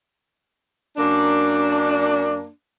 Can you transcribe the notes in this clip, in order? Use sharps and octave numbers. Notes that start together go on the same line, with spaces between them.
F#2 A#3 D4